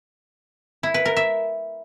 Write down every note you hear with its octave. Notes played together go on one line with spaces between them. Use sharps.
E4
B4
A#4
E5